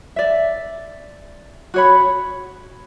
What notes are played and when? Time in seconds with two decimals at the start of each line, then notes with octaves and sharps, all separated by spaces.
0.16 D5 E5
1.74 F#4 C#5 B5